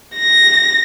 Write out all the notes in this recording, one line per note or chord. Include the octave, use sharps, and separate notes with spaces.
A#6